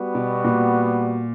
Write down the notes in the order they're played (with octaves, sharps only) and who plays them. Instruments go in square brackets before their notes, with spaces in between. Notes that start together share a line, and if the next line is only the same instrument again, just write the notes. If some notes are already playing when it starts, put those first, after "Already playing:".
Already playing: [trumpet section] G3 B3 F#4
[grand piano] B2
A#2